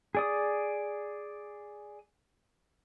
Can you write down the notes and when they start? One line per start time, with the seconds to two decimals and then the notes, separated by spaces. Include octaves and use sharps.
0.15 G#4 D5 D#6